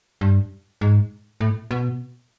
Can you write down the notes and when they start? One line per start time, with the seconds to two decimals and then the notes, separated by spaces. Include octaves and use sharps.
0.21 G2
0.81 G#2
1.41 A2
1.71 B2